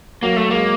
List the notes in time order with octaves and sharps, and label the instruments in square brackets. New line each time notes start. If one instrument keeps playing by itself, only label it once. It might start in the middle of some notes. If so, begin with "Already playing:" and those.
[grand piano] F#3 [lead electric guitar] A#3
[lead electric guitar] A3
[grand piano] G#3 [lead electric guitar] A#3